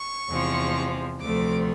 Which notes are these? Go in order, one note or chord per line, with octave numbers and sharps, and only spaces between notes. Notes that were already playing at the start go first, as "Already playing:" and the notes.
Already playing: C#6
E2 C3 F3 G#3
D2 C3 F3 A3 D6